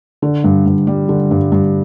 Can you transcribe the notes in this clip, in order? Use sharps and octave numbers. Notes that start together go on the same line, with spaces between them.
D3
G2
G2
G3
D3
G2
G2